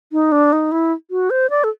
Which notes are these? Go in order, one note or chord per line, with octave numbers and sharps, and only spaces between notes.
D#4
D4
D#4
E4
F#4
C5
D5
A4